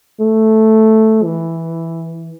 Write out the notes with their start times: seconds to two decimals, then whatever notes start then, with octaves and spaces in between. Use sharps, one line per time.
0.20 A3
1.24 E3